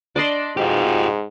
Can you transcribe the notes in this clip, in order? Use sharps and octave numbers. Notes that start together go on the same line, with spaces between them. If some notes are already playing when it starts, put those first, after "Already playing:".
D4 D5 D#5 C6
F2 G#2 B2 F4 G4